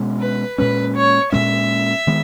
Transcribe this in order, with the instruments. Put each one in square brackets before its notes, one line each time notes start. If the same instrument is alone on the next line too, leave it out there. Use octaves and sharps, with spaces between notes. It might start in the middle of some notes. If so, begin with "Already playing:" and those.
Already playing: [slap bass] B2 G#3 C#4
[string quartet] B4
[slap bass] A#2 G#3 C#4 [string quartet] B4
[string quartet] C#5
[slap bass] A#2 G#3 C#4 [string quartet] E5
[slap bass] D#3 G#3 B3